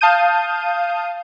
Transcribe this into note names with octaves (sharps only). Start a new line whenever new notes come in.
F5 A5 D#6 G6 D#7